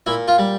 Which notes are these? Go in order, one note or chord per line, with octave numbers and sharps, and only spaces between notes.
A#2 E4
F4
G3